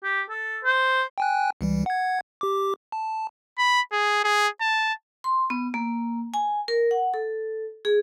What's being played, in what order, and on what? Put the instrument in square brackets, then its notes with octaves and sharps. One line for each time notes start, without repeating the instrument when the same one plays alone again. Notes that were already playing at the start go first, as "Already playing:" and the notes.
[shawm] G4
A4
C5
[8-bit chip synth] G5 G#5 F#6
C#2 E3 G3
F#5 G#6
G4 D6
A5
[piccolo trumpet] B5
G#4
G#4
A5
[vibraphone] C6
B3
A#3
G#5
A#4
F#5
A4
G#4